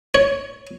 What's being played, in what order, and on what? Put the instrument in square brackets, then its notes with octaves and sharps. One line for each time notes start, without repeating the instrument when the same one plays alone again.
[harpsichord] C#5